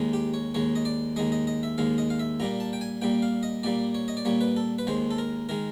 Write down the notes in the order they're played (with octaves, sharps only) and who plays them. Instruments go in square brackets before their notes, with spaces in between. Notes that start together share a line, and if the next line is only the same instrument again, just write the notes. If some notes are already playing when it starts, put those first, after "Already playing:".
Already playing: [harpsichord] D#2 D#3 G#3
G4
C#5
D#2 D#3 G#3 C#5
D#5
D5
D#2 D#3 G#3 D#5
D#5
D#5
E5
D#2 D#3 G#3 F5
D#5
F5
E5
A#2 G3 A#3 A#5
A5
G5
G#5
A#2 G3 A#3 G5
F5
D#5
A#2 G3 A#3 D5
C#5
D#5
D5
A#2 G3 A#3 C#5
B4
A4
B4
D#2 D#3 G#3 C5
A4
A#4
D#3 G#3 A#4